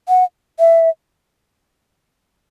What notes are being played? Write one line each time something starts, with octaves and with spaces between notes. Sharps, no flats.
F#5
E5